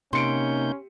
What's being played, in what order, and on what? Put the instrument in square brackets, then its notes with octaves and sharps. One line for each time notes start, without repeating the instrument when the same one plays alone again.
[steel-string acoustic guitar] C3 [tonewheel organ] A#3 D#4 G6 [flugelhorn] C#4 [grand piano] C6 C#7 D7